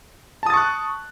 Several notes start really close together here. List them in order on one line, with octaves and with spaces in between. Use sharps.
A5 D#6 A6 C#6 F#6